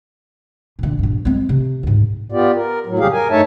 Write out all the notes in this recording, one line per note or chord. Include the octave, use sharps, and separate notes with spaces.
A#2 D3
G2 A#2
G#3 C4
C3
D2 G#2
B3 F4 G4 D5
A#4
A2 F#3
F2 C#3 G3 G4 G#4 F5
A#4 G#5
G2 A3 D#4 C#5 E5 A5